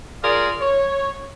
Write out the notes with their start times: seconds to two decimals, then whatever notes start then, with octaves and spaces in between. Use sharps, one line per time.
0.23 F4 G#4 A#4 D5 F5
0.60 C#5